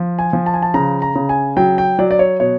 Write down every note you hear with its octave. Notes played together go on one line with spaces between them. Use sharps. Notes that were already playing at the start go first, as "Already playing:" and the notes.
Already playing: F3
G#5
F3
A5
G#5
A5
C#3 A#5
A#5
C#3
G#5
F#3 G5
G5
F#3 D5
D5
C#5
B2 C#5